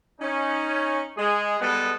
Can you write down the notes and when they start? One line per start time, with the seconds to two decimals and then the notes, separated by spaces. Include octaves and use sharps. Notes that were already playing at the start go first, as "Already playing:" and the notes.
0.21 C#4 D#4
1.18 G#3 G#4
1.60 B2 G3 G#3 B3 F#4 A4